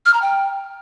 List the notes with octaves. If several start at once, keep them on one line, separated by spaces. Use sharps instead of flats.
F6
A#5
G5